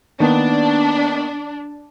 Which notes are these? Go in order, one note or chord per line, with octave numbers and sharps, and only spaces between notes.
D#3 A#3 B3 D4